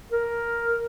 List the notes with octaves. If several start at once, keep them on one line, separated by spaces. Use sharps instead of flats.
A#4